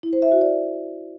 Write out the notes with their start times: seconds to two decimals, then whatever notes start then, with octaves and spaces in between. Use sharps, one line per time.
0.03 E4
0.13 C5
0.22 E5
0.32 F#4
0.41 D5